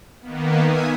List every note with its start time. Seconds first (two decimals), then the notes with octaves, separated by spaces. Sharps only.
0.21 D#3 A#3 B3
0.63 E5 G#5 D#6